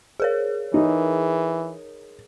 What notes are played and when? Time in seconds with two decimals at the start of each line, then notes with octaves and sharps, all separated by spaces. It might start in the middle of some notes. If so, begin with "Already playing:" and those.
0.20 G#4 A#4 C#5
0.74 E3 D#4